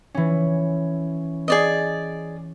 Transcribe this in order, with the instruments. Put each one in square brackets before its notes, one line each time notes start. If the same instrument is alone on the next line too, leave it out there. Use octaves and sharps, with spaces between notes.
[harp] E3 C#4
[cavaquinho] G#4 D5 D#5